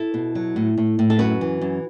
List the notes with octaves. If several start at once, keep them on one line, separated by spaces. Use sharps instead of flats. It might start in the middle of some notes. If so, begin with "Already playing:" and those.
Already playing: E4 A4
B2
F#3
A2
A2
A2
A4
F#2 F#4 B4
E3
F#2